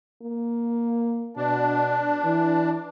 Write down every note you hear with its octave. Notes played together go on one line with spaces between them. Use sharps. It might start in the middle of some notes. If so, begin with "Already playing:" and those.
A#3
B2 D4
E3